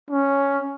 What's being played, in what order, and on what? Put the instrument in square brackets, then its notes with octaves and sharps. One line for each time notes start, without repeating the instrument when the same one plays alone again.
[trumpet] C#4